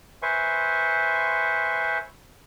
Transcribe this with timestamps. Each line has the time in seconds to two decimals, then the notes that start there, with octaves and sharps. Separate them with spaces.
0.22 B4 C5 E5 G#5 C6 C#6